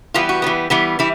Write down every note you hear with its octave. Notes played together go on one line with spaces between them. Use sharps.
E3 G3 B3 F4
F#4
E3 G3 B3
E3 G3 B3
E3 G3 E4